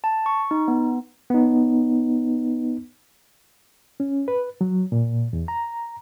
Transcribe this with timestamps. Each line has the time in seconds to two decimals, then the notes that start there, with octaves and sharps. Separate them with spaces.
0.04 A5
0.26 C#6
0.51 D#4
0.68 B3
1.30 B3 D#4
4.00 C#4
4.28 B4
4.61 F#3
4.92 A#2
5.33 E2
5.48 A#5